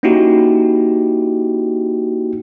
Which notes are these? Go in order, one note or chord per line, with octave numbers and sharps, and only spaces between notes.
A#3 C#4 D#4 E4 F#4 G4